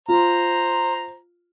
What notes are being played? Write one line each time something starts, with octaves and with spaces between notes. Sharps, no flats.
F4 C5 A#5